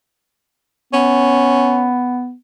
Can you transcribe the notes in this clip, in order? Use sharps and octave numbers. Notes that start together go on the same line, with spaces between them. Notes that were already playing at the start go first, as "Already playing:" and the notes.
B3 C#4